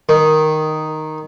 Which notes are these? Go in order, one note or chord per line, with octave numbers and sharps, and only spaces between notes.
D#3